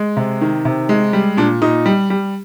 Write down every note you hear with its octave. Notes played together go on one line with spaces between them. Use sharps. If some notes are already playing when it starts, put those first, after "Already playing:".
Already playing: G#3
C3
D#3
C3
G#3
G3
A#2 D4
A#2 D#4
G3
G3